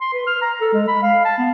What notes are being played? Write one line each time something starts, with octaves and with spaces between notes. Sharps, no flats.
C6
B4
F6
A#5
A4
G#3
B5
F5
A5
B3